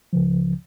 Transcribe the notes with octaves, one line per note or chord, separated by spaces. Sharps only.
C#2 C#3 F3